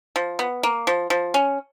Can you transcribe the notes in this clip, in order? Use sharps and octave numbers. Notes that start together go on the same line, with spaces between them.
F3
B3
A#3
F3
F3
C#4